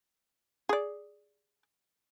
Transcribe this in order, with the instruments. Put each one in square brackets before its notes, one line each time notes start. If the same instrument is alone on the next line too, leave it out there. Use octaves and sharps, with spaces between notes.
[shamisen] G#4 D5